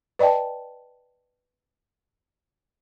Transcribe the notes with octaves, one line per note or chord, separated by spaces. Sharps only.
B4 D5 D#5 G5 A5